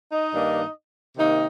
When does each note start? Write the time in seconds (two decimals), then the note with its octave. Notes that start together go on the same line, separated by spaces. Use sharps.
0.11 D#4 D#5
0.33 G2 D#3 A#3 D4
1.17 C3 D#3 A#3 D#4